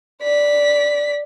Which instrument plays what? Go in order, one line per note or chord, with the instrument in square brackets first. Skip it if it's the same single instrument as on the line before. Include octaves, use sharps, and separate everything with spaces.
[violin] D5 B6